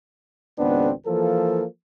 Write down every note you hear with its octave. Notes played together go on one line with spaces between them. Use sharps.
G#1 C#2 B3 C4 D4
E3 F3 A#3 A4